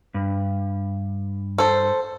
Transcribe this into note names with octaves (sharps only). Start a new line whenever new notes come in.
G2
A4 C5